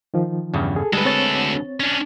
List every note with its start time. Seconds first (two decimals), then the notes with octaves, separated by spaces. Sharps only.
0.14 D#3 F3
0.54 E2 G2 C#3
0.76 G#4 A4
0.93 D2 G3 G#3 G#4 A4 B4
1.05 C4 C#5 A6
1.80 C#4 D4